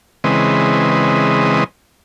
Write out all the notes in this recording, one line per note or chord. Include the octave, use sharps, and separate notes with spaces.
C#3 E3 G#3 C4 B4 D#5